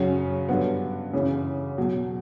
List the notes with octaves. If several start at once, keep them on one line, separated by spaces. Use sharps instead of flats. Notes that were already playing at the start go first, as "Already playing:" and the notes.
Already playing: F#2 C#3 F#3 C#4
G2 D3 F#3 B3
F#2 C#3 E3
E2 B2 F#3